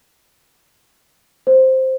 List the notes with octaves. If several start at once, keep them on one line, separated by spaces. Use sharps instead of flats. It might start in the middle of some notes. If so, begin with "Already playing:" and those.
C5